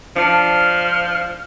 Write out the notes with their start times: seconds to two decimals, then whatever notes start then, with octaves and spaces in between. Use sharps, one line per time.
0.16 F3 D4 F6